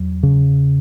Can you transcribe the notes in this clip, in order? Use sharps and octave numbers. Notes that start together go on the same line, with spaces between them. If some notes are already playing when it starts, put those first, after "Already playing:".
Already playing: E2 F#3
C#3